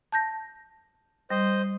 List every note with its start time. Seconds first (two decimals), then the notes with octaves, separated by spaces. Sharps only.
0.12 A5 G6 A#6
1.30 G3 C5 D#5